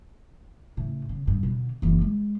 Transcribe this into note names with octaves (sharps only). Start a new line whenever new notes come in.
A2 C#3
C#3
G2
B2 D3
F#1 E3
G#3